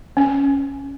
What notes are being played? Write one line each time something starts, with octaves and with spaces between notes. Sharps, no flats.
C#4